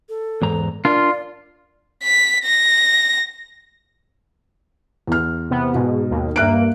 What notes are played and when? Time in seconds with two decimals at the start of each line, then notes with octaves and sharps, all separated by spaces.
0.09 A4
0.42 E2 G#2 A#5
0.85 D4 F4 A#4 D5
2.03 B6
2.45 A#6
5.07 E2 F6
5.50 C3 B3
5.75 G#2 B2
6.10 D#2
6.36 G2 A#3 E5 F#6 D7